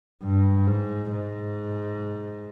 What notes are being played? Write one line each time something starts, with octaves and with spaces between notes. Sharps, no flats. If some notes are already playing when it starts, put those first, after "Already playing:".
G2
G#2
G#2